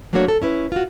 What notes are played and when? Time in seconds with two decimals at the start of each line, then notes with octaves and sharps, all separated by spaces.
0.13 F#3 A3 A#3 D4 F#4 C#5
0.28 A4
0.42 C#4 E4 B4
0.72 F4 F#4